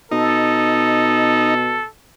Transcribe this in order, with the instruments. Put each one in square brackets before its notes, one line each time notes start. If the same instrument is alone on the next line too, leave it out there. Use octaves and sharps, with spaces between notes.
[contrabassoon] B2 [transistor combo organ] D#4 [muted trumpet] A4